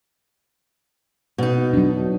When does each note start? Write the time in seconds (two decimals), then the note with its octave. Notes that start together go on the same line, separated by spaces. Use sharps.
1.38 B2 D#4
1.73 F#3 D4